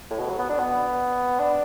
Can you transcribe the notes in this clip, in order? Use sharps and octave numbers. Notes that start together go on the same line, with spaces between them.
A2
B2
F#3
B3
D4
B3
D4